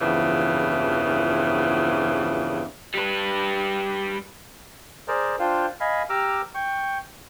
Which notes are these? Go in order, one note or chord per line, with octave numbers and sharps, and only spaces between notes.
E2 G2 A#2 C#3 E3 F3
G3 B4
G#4 A#4 C5 D5
D4 F4 C5 F5 G5
D#5 F5 G#5 B5
G4 A#5 D6 E6 F6
G5 C#6